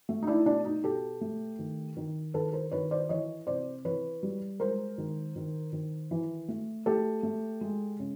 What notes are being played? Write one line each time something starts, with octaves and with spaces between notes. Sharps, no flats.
A3
D#4
D4 E4
B2 D4
D#4
B2 G4 A4
A3
D#3
D#3
D#3 A4 B4
A#4 C5
D#3 B4 C#5
C5 D5
E3 C#5 D#5
C3 C5 D5
E3 B4 C#5
G3
G#3 A#4 C5
D#3
D#3
D#3
E3
A3
A3 G4 A4
A3
G#3
C#3